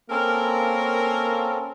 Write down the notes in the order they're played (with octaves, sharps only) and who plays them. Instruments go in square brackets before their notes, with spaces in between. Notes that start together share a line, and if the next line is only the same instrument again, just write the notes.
[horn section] A#3 A#4 [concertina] C4 C#4 A4